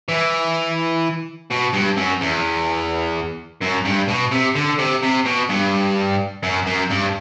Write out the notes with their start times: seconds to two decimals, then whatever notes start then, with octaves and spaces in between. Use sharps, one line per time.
0.09 E3
1.51 B2
1.73 G2
1.97 F#2
2.21 E2
3.62 F#2
3.85 G2
4.08 B2
4.31 C3
4.55 D3
4.78 C3
5.03 C3
5.25 B2
5.49 G2
6.43 F#2
6.66 F#2
6.90 G2